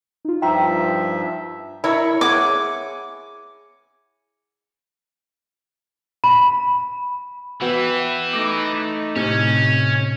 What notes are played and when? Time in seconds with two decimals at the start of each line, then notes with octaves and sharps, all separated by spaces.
0.25 D#4 F4
0.42 G2 F3 E5 G5 A#5 C6
1.84 E4 A#4 C#5
2.21 G#4 C#5 F#5 D6
6.24 B5
7.61 E3 B3 F#4 G5
8.33 A3 D#4 D6 A#6
9.16 A2 C3 C#4